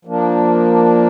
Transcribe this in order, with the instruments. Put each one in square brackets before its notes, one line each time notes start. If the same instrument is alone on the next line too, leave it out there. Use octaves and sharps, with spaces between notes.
[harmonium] F3 A#3 D4